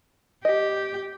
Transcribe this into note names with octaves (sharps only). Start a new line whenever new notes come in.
G4 D#5